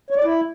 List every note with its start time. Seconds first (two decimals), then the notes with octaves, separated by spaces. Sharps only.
0.10 C#5
0.17 D5
0.24 E4